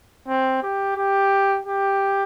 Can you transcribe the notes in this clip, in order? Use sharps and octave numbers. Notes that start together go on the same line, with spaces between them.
C4
G4
G4
G4